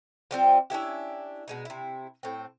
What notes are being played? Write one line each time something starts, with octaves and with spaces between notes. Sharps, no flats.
F3 G3 C4 F4
C#4 D4 E4 G4
B2 G#3 D#4
C3 E4
A2 C4